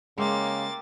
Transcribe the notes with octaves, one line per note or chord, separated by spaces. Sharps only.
C#3 G#3 A#3 G4 E5 C6 A6